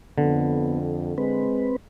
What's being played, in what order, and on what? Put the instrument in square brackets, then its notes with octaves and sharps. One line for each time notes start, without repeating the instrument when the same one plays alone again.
[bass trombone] F2 [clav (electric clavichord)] D3 [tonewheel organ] B3
[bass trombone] G#3 [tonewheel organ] C4 B4